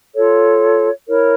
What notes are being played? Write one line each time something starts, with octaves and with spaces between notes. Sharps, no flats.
F4 A4 C#5
E4 A#4 C#5